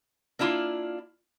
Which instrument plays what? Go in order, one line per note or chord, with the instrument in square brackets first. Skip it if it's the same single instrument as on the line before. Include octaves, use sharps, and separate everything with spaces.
[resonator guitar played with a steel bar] A#3 D4 E4 F4